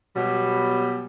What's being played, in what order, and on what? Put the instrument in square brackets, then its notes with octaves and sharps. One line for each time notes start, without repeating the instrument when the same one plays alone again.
[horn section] B2 F#3 G3